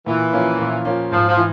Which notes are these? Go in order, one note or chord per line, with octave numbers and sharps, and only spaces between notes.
A#2 E3
F3 A#3 C#4
A#2
F3 A#3 C#4
G#2 F3
F3
E3